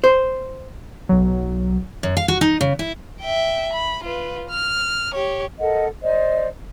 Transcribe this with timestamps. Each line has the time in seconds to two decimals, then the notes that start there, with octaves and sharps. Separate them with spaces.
0.04 C5
1.09 B1 F#3
2.03 F#2
2.17 F5
2.28 F#4
2.41 D#4
2.61 C#3
2.79 E4
3.21 E5 G5
3.73 B5
4.03 F4 B4
4.49 F6
5.14 G4 C#5
5.60 A4 A#4 D#5 F#5
6.02 C5 D5 D#5